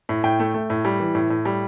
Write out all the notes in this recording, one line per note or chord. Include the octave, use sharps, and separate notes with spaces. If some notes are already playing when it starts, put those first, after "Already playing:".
A2
A2 G5
A3
A3
A2
G3
E3
A2
A2
G3